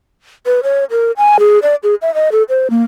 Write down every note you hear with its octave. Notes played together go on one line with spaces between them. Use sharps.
B4
C#5
A#4
G#5
G#4
D5
G#4
E5
D#5
A4
C5
A#3